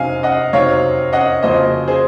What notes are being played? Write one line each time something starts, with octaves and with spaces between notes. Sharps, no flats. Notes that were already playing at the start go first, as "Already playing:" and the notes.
Already playing: C3 F#3 C4 D#4 F5 G#5
D#5 F#5
C3 F#3 C4 D#4 C#5 F5
D#5 F#5
F2 C#3 F#3 A#3 C5 D#5
G#4 C5